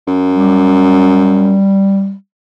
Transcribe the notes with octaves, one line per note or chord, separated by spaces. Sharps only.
F#2
G3